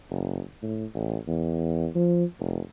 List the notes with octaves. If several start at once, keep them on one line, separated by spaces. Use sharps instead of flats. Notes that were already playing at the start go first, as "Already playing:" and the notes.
F#1
A2
A1
E2
F3
F1